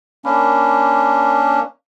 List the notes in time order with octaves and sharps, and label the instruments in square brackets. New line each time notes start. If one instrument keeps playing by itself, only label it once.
[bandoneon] A#3 C#4 D4 [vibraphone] A#4 B5